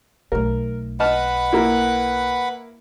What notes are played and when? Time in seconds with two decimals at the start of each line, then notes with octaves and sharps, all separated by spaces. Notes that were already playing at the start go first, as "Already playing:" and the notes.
0.32 B1 A3 A#4
1.00 B4 D#5 F#5 A5 B5 F6
1.53 A#3 E4